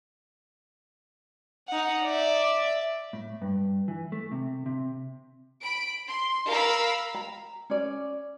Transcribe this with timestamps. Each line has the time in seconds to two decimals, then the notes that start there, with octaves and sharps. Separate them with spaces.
1.68 D#4 F#5
2.05 D5 E5
3.13 A2
3.42 G2
3.88 E3
4.12 A3
4.31 C3
4.66 C3
5.61 B5 D7
6.06 C6
6.47 A#4 F5 A#5 B5 E6
7.15 A#5
7.70 C#4 D5